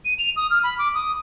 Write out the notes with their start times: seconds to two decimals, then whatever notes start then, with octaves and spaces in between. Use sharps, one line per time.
0.05 D#7
0.19 F7
0.36 D#6
0.50 F6
0.63 B5
0.78 D6
0.94 D#6